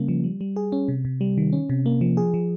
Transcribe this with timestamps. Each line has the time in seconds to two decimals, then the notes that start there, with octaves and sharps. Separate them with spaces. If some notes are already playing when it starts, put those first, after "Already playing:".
Already playing: C#3 G3 A#3 C#4
0.08 F3
0.24 G3
0.41 G3
0.56 G#4
0.72 C#4
0.88 C3
1.05 C3
1.21 G3
1.38 D#3
1.53 C#4
1.70 C3
1.86 A#3
2.01 F3
2.17 G#4
2.34 F3